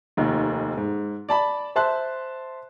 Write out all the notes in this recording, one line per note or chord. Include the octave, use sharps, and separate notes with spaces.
F1 D#2 D#3
G#2
D5 A5 B5
C5 E5 A5 C6 F#6